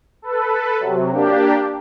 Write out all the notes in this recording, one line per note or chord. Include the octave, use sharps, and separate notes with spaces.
A4 B4
C3 F#3
A#3 D4 G4